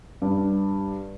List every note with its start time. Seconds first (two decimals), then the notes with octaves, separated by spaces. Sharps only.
0.22 G2